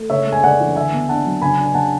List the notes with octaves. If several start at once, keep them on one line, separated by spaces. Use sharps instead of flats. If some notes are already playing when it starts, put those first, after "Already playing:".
Already playing: A3
C#3 C#5 E5
G#3
G#5
C#3 D5 F#5
E3
D3 E5 G#5
B3
D4 F#5 A5
F#3
C#3 G#5 B5
D4
G#5
C#3 F#5 A5